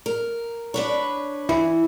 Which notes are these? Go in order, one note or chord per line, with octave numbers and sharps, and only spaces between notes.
A#4
D4 B4 C#5
E3 E4